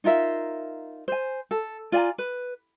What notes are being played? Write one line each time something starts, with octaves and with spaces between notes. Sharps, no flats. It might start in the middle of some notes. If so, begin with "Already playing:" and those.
D#4 F4 A#4 E5
C5 G#5
A4
F4 D5 G#5 A#5
B4